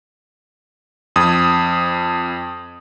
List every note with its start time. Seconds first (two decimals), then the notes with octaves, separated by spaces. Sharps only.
1.16 F2 D#6